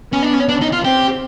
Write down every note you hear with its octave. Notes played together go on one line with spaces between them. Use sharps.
B3 C#4
D4
C#4
D4
D#4
F4
C4 G4